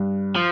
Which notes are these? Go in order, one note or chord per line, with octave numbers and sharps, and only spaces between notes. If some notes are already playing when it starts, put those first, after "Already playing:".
Already playing: G2
F3